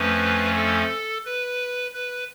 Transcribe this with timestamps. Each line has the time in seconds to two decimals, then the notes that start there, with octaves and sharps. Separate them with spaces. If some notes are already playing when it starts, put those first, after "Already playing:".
Already playing: F2 F3 A3 C#4 B4
0.56 A4
1.26 B4
1.94 B4